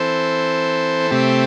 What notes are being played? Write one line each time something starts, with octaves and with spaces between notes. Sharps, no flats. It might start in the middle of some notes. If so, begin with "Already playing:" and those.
Already playing: E3 C4 A4 C5
C3 A3 C4 G4